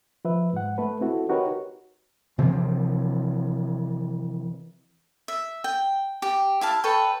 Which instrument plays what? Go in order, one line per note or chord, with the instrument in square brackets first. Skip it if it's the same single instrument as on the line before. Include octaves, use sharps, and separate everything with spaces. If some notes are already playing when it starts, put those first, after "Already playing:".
[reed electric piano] F3 B4 E5
G#2 F#5
A3 A4 B4
C4 E4 F#4 A4
D#4 F#4 G4 A#4 B4 C#5
[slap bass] C3 E3 F3 C4
[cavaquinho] E5
G5
G4
E4 F5 A5
A4 B4 C#5 G5